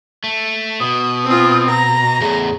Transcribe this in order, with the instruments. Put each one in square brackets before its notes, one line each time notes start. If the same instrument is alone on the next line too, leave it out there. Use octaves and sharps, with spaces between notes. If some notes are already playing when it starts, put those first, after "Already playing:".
[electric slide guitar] A3
[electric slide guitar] B2 [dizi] D#6
[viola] C4 F4
A#5
[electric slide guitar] E2 A2 [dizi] G#4